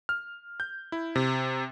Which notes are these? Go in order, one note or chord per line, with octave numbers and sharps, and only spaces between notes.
F6
G6
E4
C3